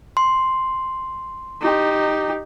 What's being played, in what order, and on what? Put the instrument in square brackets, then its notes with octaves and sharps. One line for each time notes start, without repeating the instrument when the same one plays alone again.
[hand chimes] C6
[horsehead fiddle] D#4 G4